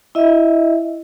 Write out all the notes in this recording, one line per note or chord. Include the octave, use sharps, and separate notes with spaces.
E4 D#5 E5